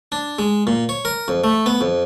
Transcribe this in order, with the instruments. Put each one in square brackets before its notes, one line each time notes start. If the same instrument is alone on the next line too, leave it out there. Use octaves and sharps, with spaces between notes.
[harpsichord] D4
G#3
A#2
C#5
A#4
F2
A3
B3
F2